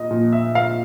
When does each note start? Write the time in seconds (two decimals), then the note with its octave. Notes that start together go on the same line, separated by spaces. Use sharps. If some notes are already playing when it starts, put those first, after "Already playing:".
Already playing: A#2 D#5
0.11 A#2 F3
0.33 E5
0.55 F5